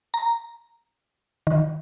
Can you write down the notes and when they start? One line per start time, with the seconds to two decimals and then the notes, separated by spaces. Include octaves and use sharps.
0.14 A#5
1.47 D#3